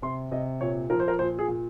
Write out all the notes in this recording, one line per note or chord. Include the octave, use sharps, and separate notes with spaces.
C3 C6
C3 D#5
A#2 C#5
F3 A#4
C5
A#4
A#2 C5
G#4
A#2